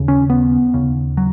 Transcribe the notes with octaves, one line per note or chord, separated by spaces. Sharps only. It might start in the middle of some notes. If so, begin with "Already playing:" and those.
Already playing: D#2 C#3
C#4
B3
D#2 C#3
F#3